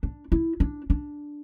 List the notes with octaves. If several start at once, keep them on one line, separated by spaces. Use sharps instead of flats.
D4
E4
D4
D4